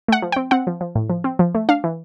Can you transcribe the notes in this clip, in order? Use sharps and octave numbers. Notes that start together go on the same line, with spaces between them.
A3 F#5
F3
C4 G5
C4 F#5
F3
F3
A2
F3
C4
F3
A3
D4 F5
E3